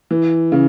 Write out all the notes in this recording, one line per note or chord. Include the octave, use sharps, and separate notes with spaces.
E3
C#3